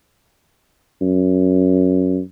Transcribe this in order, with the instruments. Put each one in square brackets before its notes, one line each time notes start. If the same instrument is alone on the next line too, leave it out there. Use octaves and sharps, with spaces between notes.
[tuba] F#2